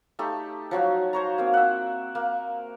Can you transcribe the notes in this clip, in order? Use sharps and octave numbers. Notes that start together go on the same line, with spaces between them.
A3 D#4 G4 A4
F3 F#3 D#4 F#4
C5 C#5 A#5
A#3 C4
E5 F#5
A#3